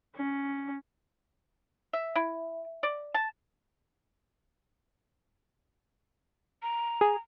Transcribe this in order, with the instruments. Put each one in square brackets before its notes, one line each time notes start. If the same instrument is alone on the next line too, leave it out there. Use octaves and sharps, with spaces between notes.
[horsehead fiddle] C#4
[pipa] E5
E4
D5
A5
[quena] A#5
[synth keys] G#4